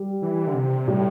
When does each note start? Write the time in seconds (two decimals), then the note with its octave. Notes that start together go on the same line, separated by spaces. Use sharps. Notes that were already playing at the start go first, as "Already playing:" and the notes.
Already playing: G3
0.22 E3
0.47 D3
0.54 C3
0.87 A2 G3